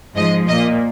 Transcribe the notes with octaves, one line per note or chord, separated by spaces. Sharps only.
G#2 F3 G#3 D#5
A#2 A#3 D#5